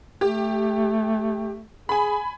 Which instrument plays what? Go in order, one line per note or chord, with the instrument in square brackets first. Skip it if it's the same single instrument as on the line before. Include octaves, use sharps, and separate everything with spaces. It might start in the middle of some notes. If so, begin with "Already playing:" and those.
[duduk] A3 [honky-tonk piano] G4
[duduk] G#4 [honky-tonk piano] G#5 B5